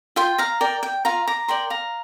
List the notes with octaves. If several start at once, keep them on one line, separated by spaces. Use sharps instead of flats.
F4 G5 C6
F5 A#5
A#4 D5 G5
G5
F4 F5 A#5
A#5 D6
A#4 D5 G5 C6
F5 A#5